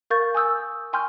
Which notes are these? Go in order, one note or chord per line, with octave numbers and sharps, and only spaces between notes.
A#4 F5 C#6 G6 A6
G#5 D#6 E6 G6
G5 G#5 C6 C#6 F6 G6